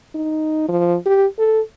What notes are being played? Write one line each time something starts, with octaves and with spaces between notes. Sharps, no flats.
D#4
F3
G4
A4